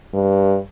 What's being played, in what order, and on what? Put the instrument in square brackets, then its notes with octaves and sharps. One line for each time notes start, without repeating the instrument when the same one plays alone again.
[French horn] G2